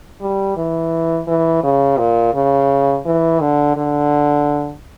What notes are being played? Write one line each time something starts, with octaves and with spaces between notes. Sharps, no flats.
G3
E3
E3
C#3
A#2
C#3
E3
D3
D3